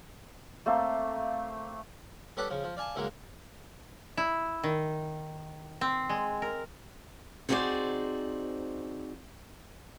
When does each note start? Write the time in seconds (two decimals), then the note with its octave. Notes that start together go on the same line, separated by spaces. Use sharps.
0.66 A3 A#3 C4
2.37 G3 C#4 A4 B4 D5 F#5
2.50 C#3 F3
2.64 F3
2.77 D5 F5 G#5 A5
2.96 C#3 E3 F#3 G#3 A#3
4.17 E4
4.64 D#3
5.81 C4
6.10 G#3
6.42 A#4
7.49 C4 D#4 F#4 G#4 C5 D5